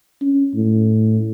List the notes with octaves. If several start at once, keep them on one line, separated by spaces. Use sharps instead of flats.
C#4
A2